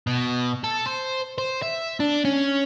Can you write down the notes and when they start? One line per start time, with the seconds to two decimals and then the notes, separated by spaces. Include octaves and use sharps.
0.07 B2
0.64 A4
0.86 C5
1.38 C5
1.62 E5
2.00 D4
2.25 C#4